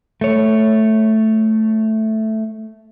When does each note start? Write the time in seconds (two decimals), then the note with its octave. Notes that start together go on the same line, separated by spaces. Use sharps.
0.21 A3 C#5